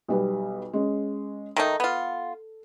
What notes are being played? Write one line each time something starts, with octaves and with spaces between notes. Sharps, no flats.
B1 G3 B4
G#3 C#4
D#3 A3 D#4 A4
B3 F4